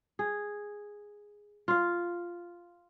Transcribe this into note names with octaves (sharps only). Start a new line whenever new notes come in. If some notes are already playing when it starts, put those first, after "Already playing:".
G#4
F4 F5